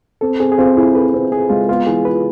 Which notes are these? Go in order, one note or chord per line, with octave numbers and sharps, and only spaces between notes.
C4 A4
C4 G#4
G#4
C4 F4
E4 G#4
A4 B4
C4
C4 G#4
G#3 F4
B3 F4
E3 G#4
F4 B4